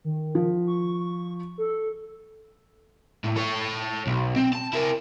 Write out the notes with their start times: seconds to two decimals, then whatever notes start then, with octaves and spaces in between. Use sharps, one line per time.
0.05 D#3
0.35 F3
0.67 C#6
1.58 A4
3.24 A2
3.37 A4 C#5
4.07 B1
4.36 C4
4.53 A5
4.73 E4 A#4